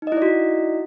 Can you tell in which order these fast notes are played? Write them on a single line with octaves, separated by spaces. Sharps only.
D#4 D#5 E4 D5 F#4